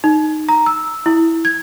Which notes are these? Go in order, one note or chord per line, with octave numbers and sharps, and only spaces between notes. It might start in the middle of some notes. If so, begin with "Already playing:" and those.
D#4
A#5
E6
E4
G#6